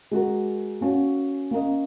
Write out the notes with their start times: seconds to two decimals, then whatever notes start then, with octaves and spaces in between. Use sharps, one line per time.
0.11 G#3 F#4 A#4
0.81 A#3 C#4 F#4 C#5
1.51 A#3 C#4 A#4 D#5